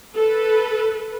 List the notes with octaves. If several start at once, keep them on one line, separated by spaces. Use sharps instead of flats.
A4 B4